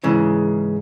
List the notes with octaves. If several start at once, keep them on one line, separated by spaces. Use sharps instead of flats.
G#2 C#3 E3